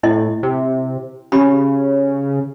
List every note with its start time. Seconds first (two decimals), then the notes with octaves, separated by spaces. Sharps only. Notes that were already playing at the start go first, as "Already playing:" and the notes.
0.03 A2 E4 D#5
0.43 C3
1.32 C#3 C#4 G4 B5